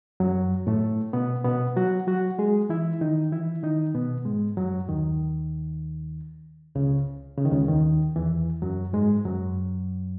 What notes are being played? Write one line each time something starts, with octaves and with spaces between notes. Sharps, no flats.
F#2 F#3
A2 A3
B2 B3
B2 B3
F#3 F#4
F#3 F#4
G#3 G#4
E3 E4
D#3 D#4
E3 E4
D#3 D#4
B2 B3
G#2 G#3
F#2 F#3
D#2 D#3
C#2 C#3
C#3
D#3
C#2 C#3
D#2 D#3
E2 E3
F#2 F#3
G#2 G#3
F#2 F#3